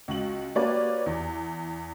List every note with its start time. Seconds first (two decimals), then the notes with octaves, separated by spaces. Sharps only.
0.08 C#2 F#4 F#7
0.55 A#3 F#4 G4 B4 C#5 D5
1.06 E2